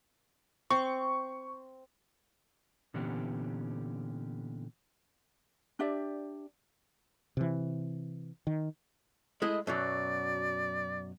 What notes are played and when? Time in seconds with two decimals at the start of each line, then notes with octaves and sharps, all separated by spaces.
0.70 C4 C#6
2.94 A#2 D3 E3 B3 C#4 G4
5.79 D4 G4 D5 E5
7.37 C3 E3
8.47 D#3
9.42 G#3 A3 E4 D#5
9.67 F#2 B2 F#3 D5